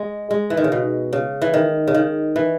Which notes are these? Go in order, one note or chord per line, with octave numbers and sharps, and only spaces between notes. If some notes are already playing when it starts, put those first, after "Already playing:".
Already playing: G#3
G#3
E3
D#3
C#3
B2
C#3
E3
D#3
C#3
D#3
E3